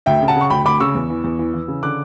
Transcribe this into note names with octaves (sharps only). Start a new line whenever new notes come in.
D2 E5 G5
C#3
F#5 A5
C#3
C#6
D2 G5 B5
D2 B5 D6
C#3 C#6 E6
E2
E3
E2
E3
E3
C#3
D3 D6 F#6